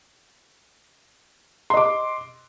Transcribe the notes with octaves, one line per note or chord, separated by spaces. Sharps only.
D#5 C6 D6